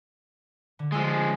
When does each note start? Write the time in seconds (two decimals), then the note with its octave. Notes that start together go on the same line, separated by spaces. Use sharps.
0.79 D3
0.92 F3 G#3 G#5 E6 F6